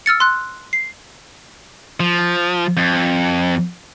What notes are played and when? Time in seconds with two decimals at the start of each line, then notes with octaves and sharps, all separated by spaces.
0.06 E6 F6 A6 C#7
0.20 C6 F#6
0.73 C7
2.00 F3
2.77 F2